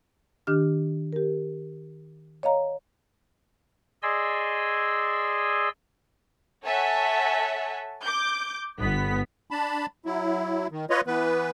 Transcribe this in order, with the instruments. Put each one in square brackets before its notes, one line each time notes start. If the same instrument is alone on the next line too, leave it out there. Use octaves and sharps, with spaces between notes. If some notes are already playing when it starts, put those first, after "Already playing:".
[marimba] D#3 D4 G4 F6
G4 A#4
C#5 D#5 F5 A#5
[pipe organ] G#4 D5 D#5 G#5 C6 E6
[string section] A4 C#5 E5 F#5 G#5 A5
D6 G6
G1 B3 B6
[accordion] D4 A5 B5
F#3 E4
D#3
F4 B4 C#5 D#5
E3 B3 B4